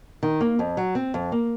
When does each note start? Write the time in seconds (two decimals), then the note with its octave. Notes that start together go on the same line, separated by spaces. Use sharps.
0.23 D#3
0.41 A#3
0.59 F2
0.77 F#3
0.95 C4
1.14 F2
1.32 A#3